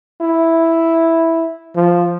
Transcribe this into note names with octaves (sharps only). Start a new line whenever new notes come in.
E4
F3